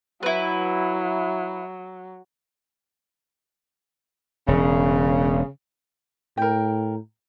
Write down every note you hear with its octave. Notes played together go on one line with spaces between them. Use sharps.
F#3 E4 B4
E1 C#3
A2 A#4 G5